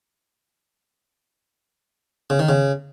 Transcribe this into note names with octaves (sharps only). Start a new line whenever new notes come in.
C#3
D#3
C#3